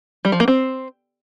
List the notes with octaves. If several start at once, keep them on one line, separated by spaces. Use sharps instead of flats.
G3
F3
A#3
C4